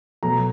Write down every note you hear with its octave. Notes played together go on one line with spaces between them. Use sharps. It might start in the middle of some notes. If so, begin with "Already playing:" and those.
B2 F#3 A3 A#5